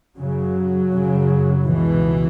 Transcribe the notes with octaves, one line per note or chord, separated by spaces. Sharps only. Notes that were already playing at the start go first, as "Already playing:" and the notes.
F#2 C#3 F#3
F#2 C#3
C#2 B2 E3